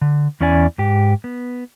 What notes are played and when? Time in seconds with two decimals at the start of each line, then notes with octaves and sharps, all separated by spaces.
0.01 D3
0.41 E2 C#4 E4 D5 G#5
0.78 G#2 G4
1.24 B3